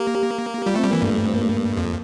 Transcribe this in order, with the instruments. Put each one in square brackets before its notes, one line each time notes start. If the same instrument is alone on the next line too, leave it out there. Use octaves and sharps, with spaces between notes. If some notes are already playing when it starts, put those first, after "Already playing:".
Already playing: [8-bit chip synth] A#3 [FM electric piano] G4
[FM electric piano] G4
G4
[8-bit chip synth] G3 [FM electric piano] F4
[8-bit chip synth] A3 [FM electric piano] C4
[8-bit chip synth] G3
[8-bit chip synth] E3 [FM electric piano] A#3
[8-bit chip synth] G2 [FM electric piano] A3
[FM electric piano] A3
C4
A#3
A3
A#3
[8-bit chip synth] F2